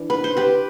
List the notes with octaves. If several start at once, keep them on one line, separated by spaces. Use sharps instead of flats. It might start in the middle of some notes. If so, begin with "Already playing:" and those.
Already playing: E3 D4
B4
C5
G4 B4